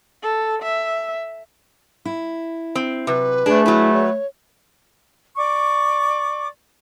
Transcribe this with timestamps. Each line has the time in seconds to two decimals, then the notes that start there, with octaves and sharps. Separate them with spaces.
0.23 A4
0.63 E5
2.05 E4
2.75 C4
3.07 C3 F#3 B4
3.46 A3 D4 G#4 D5
3.66 F#3 E4 B4
3.93 C#5
5.36 D5 C#6 D6